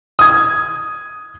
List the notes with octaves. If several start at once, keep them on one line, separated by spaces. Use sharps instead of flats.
D#6 G#6